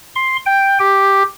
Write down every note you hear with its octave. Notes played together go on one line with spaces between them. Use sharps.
C6
G5
G4